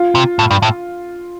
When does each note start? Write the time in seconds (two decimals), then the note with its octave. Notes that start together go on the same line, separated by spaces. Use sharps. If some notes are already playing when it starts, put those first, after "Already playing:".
Already playing: F4
0.15 C3
0.39 A2
0.51 G2
0.62 A2